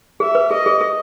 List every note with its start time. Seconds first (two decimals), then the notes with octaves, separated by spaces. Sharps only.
0.20 G#4 E5
0.35 B4
0.51 G#4 D#5
0.66 G#4
0.81 G#4